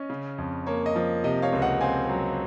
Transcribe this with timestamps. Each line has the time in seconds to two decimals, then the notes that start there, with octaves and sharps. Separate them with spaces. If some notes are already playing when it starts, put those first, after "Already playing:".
Already playing: C#4 D#5
0.10 C#3
0.38 F2
0.67 A#3 C#5
0.86 D#5
0.96 F3
1.24 C3 D#5
1.42 C#5 F5
1.53 C#2
1.62 D#5 F#5
1.81 C4 F5 G#5
2.10 F#3